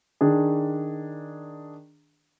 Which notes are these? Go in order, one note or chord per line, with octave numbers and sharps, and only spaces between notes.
D#3 D4 G#4